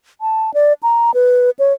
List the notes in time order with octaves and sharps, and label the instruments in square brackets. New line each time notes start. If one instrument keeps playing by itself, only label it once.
[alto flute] A5
D5
A#5
B4
C#5